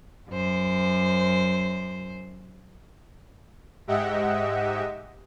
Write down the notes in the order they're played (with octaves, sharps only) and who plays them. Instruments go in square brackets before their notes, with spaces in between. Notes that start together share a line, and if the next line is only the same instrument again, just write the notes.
[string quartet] F#2 C5
[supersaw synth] G#2 G4 D#5 E5 F#5